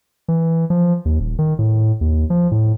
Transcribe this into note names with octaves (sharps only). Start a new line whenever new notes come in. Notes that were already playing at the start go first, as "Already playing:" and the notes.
E3
F3
D#2
D#1
D#3
A2
D#2
F3
A2